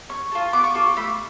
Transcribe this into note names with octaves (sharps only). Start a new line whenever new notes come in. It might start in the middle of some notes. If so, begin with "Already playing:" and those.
C#4 C#6
F4 A4
B3 D6
C#6
F4 A4 D6
C#6
A3 B5